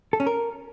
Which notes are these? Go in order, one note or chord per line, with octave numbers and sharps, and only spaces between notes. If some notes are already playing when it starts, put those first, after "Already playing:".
A4
C#4
A#4